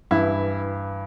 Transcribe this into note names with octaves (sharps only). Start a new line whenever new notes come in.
G2 E3 E4